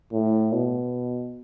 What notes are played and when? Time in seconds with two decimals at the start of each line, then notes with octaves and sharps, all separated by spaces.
0.13 A2
0.53 B2